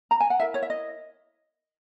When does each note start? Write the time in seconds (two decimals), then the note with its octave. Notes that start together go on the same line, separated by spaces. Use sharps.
0.11 A#5
0.20 G#5
0.30 F#5
0.40 E4 A#4 E5
0.54 C#5
0.62 E5
0.70 D#5